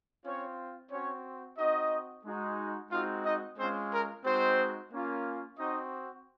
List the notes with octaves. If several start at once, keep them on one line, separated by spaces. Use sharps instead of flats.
C4 C#4 F4 C#5
C4 C#4 F#4 C#5
C4 D#4 F#4 D#5
G#3 D#4 F#4
G#3 C4 D#4 F4 F#4 F5
D#4 D#5
G#3 C4 C#4 F4 C5
A#4
G#3 C4 D#4 F#4 C5
A#3 C#4 F4
C4 D#4 F#4 D#5